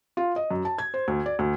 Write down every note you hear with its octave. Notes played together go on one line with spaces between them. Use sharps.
F4
D#5
F#2
A5
G#6
C5
D2
D5
D2